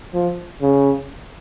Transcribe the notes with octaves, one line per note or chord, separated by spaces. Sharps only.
F3
C#3